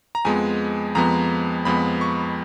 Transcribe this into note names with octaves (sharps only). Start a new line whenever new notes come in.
A#5
F2 F3 G#3 B3 G#5
F2 F3 G#3 B3 A#5
F2 F3 G#3 B3 B5
C#6